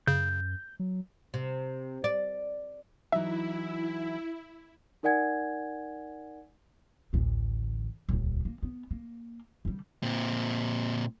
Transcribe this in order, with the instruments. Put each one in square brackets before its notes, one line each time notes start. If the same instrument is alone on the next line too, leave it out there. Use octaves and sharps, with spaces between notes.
[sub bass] F#2 [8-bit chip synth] C#3 [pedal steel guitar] G6
[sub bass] F#3
[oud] C3
D5
[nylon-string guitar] E3 F#3 D#4 [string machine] E4 [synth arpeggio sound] E5
[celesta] D#4 A#4 D5 F#5 G#5 G#6
[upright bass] A1 D2
D#1 C#2
A#3
B3
A#3
D3 G3
[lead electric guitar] A#2 C4